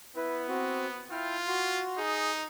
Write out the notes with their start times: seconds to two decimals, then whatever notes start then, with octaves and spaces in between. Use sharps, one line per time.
0.16 B3 E4 B4
0.48 C4 F#4
1.11 E4 F4 G5 F6
1.47 F#4 C6
1.98 D#4 G#4